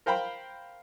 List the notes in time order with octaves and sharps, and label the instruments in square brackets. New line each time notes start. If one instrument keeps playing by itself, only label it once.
[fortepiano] A#4 C5 F5 G5 B5